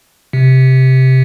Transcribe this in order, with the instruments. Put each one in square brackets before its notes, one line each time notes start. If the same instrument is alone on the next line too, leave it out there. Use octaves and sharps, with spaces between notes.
[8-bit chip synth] C3